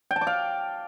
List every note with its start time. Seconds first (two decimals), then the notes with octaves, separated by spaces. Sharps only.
0.11 G5
0.16 A5
0.21 D6
0.27 F5